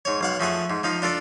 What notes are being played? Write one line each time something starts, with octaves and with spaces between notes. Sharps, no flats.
G#2 C#5
B1 F5 F#5
F3 A3 G#4 F#5
G#2
F3 D#4 F5
D4 F4 A4 D5